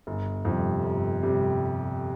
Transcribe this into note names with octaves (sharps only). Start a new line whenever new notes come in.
G1
F2 C3 G3
G1
C3 G3